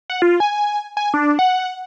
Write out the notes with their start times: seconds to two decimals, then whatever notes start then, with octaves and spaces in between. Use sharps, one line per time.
0.10 F#5
0.22 F4
0.40 G#5
0.97 G#5
1.14 D4
1.39 F#5